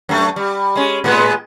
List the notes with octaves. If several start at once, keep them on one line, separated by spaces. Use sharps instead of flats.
F#2 A3
G3
G#3 C#4
A2 G#3 B3